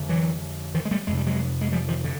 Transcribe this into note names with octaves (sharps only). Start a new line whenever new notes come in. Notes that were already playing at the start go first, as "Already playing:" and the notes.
Already playing: F2 D3
E3 F#3
D#3 F3
G#3
G3 A3
F2 C3 G#3
G3
F#3 G#3
G#3
F3 G3
D#3 F3
D3